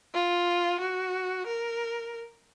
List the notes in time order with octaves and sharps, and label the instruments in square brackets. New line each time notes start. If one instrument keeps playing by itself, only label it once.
[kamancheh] F4
F#4
A#4